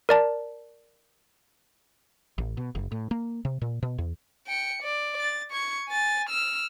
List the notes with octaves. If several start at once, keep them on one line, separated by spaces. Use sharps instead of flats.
A#4 D5 A5
A1
B2
F#1
A2
A#3
C3
A#2
B2
E2
G5 C#7
D5
A6
C#6 G#6
G#5 A6
E6 F6